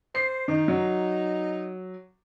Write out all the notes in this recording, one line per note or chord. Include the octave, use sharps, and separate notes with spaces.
C5 C7
D#3 D#4
F#3